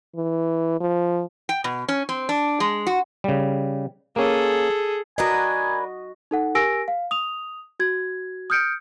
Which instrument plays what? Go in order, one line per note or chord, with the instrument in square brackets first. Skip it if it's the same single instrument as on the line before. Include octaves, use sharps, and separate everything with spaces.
[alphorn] E3
F3
[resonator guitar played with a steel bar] G5
B2
C#4
C4
D4
G#3
F#4
[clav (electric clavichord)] C#3 G3
[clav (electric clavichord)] A#3 C#4 [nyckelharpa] G#4 A4
[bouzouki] D4 A#4 B4 [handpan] F#4 D#5 [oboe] G#5
[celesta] D#4 A4 F#5
G4 A#4 G#5 E6 A#6 D7
F5
D#6 F7
F#4 G#6
D#6 F6 G6 C#7 D7